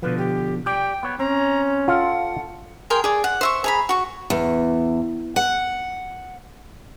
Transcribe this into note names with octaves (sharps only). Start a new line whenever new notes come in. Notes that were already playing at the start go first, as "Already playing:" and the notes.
B2 D3 F3 B4
G4
G4 D5 G5
B3 C#5
C4 C#4 A#5
F4 A4 F5 F#5
G#4 A#4 G5 C6
G#4 D5
F#5
C5 E5 C#6
G#4 A#5 B5
F#4 C#6
E2
F#5